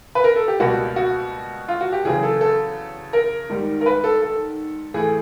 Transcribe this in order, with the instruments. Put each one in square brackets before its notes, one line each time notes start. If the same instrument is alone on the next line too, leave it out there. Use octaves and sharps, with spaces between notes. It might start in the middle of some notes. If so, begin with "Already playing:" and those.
[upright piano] B4
A#4
A4
G4
C#2 B2 G3 A#3 F#4
F#4
F4
F#4
G4
E2 C#3 F#3 G#4
A4
A4
A#4
G#2 D#3 G3
A#4
B4
A4
A4
A2 E3 A3 G#4